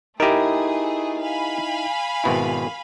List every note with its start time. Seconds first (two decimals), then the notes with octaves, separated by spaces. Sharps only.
0.20 A3 D#4 E4 G4 G#4 A#4
1.21 F5 G#5 B5
2.24 G#1 B2 E4